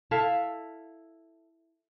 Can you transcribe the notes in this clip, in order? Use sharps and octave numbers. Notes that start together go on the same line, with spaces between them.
E4 A4 E5 F5